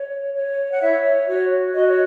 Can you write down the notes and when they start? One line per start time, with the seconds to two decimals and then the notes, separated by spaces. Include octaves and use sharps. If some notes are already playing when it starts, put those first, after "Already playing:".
Already playing: C#5
0.34 C#5
0.72 F#5
0.81 E4 C#5 E5
1.28 F#4 C#5
1.74 F#4 D#5
1.88 C#5